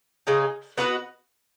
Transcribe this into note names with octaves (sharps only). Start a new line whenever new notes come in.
C#3 G#3 D#4
B3 F#4 B4 D#5